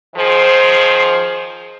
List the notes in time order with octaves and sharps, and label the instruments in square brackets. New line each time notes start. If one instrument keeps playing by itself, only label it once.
[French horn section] D#3 F3 G#4 C5